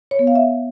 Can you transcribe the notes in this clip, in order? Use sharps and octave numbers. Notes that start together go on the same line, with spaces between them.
C#5
B3
F5
E5